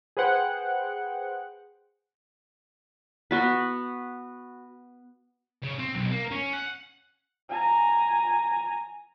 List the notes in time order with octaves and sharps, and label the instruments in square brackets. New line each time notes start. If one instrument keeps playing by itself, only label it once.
[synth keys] G#4 B4 C5 F#5 G5
[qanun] B3 F#4 B4
[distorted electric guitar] C#3
C4
B1
A#3
C#4
F#5
[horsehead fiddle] G#5 A#5